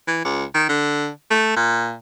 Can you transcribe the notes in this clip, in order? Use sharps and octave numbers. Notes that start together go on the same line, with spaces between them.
E3
C#2
D#3
D3
A3
A#2